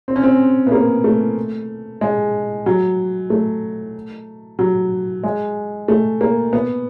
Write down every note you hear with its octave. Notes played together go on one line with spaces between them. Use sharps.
C4
C#4
C4
B3
A#3
A3
G#3
F#3
A3
F#3
G#3
A3
A#3
B3